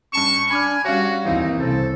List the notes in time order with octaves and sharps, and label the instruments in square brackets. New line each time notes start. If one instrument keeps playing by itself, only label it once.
[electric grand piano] G2 A5 E7 [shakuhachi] C#4 [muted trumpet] C#6
[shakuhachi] D4 [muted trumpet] G#5 [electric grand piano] B5 D6 F6
[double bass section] G3 [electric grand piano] C#4 C#5 [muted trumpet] F#4 [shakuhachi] F5
[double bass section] D#2 [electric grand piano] E3 C4 [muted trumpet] D#4
[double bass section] C2 C#3 [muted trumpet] A4 [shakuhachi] C5